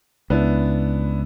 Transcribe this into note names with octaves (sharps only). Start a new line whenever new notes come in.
C#2 B3 D4 E4